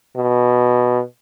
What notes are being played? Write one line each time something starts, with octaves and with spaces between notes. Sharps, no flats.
B2